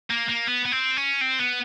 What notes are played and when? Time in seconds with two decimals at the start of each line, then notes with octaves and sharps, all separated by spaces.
0.10 A#3
0.28 A#3
0.47 B3
0.65 B3
0.72 C4
0.97 C#4
1.21 C4
1.39 B3